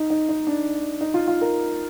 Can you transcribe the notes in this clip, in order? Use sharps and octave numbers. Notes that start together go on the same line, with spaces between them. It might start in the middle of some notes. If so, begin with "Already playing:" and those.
Already playing: D#4
D#4
D#4
D4
D#4
F4
F4
A#4